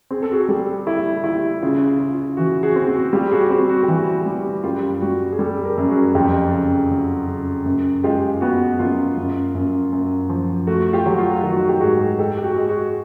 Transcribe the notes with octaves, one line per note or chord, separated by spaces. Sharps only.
C4 G#4
A4
F#4 G#4
G3 G4 A4
E4 G4 A4
E4 F4 G4
C#3 F4
F4
C#3
F4
E3 F#4
F#4 G#4
C4
F#4
G3 F4 G4
F#4 G#4
C4 F#4
F#4
G4
E3 F#4
G3
F#2 F4 G4
G3 F#4
G#4
G3 G4 A4
G#4 A#4
F#2
F#4 G#4
F2 F4 G4
C#3
F#3
C#3
F#2
G#3 F4 G4
B3 F#4
F#2 F4
F#2
F#2
F#2
F3
A3 F#4
F4 G4
F#3
F4
F4
D#3 F#4
F#4
G4
G#2 F#4 G#4
G#3 G4 A4
G4
F#4
G#3
F#4 G#4